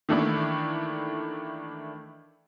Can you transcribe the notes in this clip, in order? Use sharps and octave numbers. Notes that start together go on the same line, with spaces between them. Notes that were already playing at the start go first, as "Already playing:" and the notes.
D#3 E3 A3 A#3 D4 E4